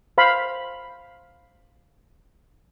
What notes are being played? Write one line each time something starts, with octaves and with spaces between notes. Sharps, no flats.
C5 F5 B5